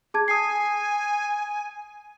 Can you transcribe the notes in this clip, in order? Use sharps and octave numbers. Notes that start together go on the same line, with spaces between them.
G#4 A5 G#6
G#5 D#6 C7